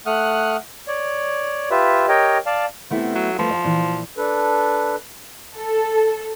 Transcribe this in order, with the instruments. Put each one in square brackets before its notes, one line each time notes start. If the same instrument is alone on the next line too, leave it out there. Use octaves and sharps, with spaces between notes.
[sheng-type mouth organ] A3 F#5 D#6 F6 F#6
C#5 D5
F4 G4 B4 E5
G4 A#4 C#5 D#5 G5
D5 F5 A5
[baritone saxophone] C3 [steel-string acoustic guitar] A3 B3 E4
[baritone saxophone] F#3
[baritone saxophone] F3 [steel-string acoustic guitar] A3 B4
[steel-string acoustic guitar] D#5 A#5
A#2 E3
[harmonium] D4 A4 B4
[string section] A4